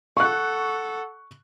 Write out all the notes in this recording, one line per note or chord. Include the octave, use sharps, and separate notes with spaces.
A4 F#5 C#6 F#6